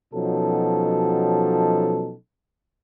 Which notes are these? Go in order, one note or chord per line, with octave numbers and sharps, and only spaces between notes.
B2 F3 F#3 C#4 D#4 A4